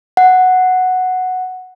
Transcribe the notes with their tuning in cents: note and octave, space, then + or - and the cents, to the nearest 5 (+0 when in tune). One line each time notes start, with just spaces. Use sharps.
F#5 -5